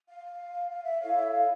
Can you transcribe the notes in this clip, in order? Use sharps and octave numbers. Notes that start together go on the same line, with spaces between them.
F5
F5
E5
E4 A4 C#5 F5
E5
F5